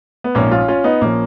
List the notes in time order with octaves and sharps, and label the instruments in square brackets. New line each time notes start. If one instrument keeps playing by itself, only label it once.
[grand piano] B3
A#1 G#2 F3 A#3 C#4
C#4 F4
C#4 F4
B3 D#4
A#1 F3 A#3 C#4